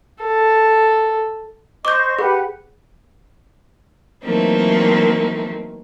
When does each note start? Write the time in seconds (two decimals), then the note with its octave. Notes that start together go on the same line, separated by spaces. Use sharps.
0.23 A4
1.85 C5 D#5 C#6 D6 G6
2.19 G4 G#4 B4 F#5
4.25 E3 F#3 A3 A#3 C4 D#4